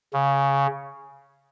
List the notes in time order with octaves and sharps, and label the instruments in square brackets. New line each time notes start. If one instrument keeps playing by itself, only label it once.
[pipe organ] C#3